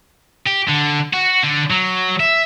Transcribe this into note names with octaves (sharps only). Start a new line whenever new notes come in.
G4
D3
F#4
D3 D4
F#3
E5